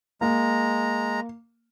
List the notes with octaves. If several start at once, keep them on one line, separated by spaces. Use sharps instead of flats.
G#3 A#3 A#5